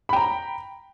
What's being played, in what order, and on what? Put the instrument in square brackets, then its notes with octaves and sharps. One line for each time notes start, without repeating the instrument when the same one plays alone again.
[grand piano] B5
G5
A#5